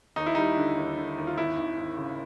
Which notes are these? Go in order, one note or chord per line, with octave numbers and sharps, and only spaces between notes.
D#2 D#4
E4
G3 D#4
D3
D#2
D3
D#2
F4
G#1 E4
G#1
G#1
C#3